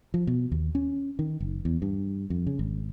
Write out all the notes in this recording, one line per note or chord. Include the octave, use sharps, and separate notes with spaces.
F3
B2
D#2
C#4
D#3
F#1
E2
G2
F2
C#3
G#1